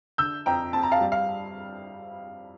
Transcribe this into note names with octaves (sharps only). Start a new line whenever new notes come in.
D3 E6 G6
F2 G5 A#5
C4 A5
A#5
F5 A5
G3
F5